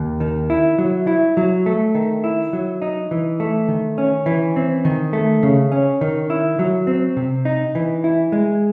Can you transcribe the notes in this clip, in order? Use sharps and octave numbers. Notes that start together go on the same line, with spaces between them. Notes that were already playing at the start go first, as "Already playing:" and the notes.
Already playing: D#2
D#3
E4
F#3
E4
F#3
A3
D#3
E4
F#3
D#4
E3
A3
D#3
C#4
E3
C4
D#3
A3
C#3
C#4
D#3
E4
F#3
C4
C3
D#4
E3
E4
G#3